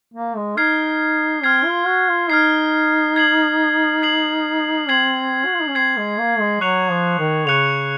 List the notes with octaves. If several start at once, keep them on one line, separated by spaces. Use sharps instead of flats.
A#3
G#3
D#4 F6 G#6 C7
C4 F6 G#6 C7
F4
F#4
F4
D#4 F6 G#6 C7
G#6 C7 F#7
G#6 C7 F#7
C4 G#6 C7 F#7
F#4
F4
D#4
C#4
C4 G#6 C7 F#7
G#3
A#3
G#3
F#3 C#6 F#6 C#7 F7
F3
D#3
C#3 C#6 F#6 C#7 F7